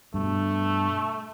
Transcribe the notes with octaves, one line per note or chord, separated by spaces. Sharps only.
G2 B2 A3